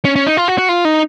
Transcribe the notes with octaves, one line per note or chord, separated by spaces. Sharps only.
C#4
C#4
D#4
F4
F#4
F#4
F4
D#4